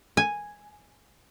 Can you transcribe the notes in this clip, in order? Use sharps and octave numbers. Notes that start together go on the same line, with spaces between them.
G#5